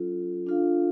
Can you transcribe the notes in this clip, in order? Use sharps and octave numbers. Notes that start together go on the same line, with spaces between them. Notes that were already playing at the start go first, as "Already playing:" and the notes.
Already playing: F#3 C#4 F4 A4
D4 F4 A4 F5